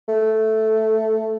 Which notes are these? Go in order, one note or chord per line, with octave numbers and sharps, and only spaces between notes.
A3